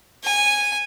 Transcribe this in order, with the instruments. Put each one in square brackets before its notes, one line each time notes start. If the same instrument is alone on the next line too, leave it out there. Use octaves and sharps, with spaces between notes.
[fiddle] G#5